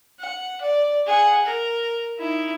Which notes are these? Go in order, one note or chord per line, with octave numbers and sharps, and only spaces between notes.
F#5
D5
G#4 F#5
A#4
D#4 E4